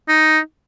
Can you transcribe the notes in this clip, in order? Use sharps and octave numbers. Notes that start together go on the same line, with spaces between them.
D#4